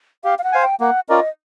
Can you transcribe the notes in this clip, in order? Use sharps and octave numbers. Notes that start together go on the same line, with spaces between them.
G4 F5
F5
F#5
C5 F5 G#5
G5
A#3 F#5
C#4 F4 A#4 D5 D#5